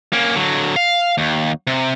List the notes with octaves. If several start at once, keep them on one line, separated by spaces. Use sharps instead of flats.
A#3 C#4
D3 F#3
F5
D#2
C3